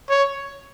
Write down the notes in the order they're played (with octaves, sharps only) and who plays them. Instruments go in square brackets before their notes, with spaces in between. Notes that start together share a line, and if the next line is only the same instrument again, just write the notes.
[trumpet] C#5